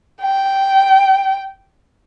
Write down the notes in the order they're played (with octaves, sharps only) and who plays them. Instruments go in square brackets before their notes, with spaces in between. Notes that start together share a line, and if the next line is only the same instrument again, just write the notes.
[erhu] G5